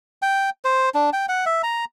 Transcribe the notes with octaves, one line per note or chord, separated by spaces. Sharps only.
G5
C5
D4
G5
F#5
E5
A#5